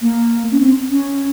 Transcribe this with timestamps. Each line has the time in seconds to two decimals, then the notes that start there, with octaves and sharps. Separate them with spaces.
0.02 A#3
0.52 C#4
0.60 C4
0.90 C#4